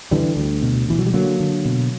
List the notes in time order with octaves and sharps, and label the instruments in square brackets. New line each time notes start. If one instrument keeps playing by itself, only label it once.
[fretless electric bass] D3 E3 G3
D2
B2
B2 E3
F#3
G3
D3 F#3 A#3
D3
B2